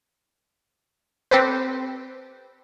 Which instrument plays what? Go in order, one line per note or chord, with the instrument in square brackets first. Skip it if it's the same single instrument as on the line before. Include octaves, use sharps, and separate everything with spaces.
[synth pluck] C4 G4 A4 B4 C5